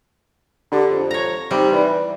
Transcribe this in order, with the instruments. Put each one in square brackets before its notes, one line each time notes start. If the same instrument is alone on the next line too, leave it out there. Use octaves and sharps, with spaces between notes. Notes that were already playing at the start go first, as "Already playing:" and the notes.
[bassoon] D3 [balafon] D4 G4
[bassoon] F2
[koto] C#5 A#5
[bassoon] C3 [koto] G3 [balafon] D#4 G5
[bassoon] E3 [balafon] D#4 D5 B5